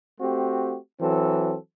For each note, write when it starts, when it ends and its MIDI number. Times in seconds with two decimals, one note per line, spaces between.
0.20 0.76 57
0.20 0.76 60
0.20 0.76 66
0.20 0.76 67
1.00 1.55 52
1.00 1.55 54
1.00 1.55 60
1.00 1.55 69